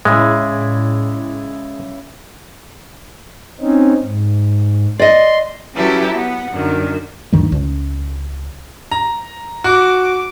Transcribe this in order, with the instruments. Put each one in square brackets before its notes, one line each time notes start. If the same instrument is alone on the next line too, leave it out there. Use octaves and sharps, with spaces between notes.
[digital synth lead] A2 [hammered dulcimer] C#3 E4 D5 [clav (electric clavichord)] G#3
[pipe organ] C4 C#4 D#4
G#2
[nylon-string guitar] D5 D#5 [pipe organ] C6
[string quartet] F#3 C#4 E4 G4 A4 B4
B3 F#5
F#2 D3 D#3
[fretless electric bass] D2 G2 D#3 G#3
C#2
[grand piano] A#5
[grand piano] F#4 [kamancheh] D6